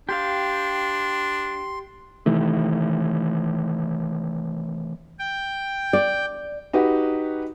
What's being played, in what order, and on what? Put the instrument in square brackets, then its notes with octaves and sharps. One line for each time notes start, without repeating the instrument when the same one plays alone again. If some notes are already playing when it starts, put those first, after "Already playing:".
[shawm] D4 [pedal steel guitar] G4 F5 [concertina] C6
[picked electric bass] C3 D#3 E3 A3
[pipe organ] G5
[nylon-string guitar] D5
[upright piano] D#4 F#4 G4 B4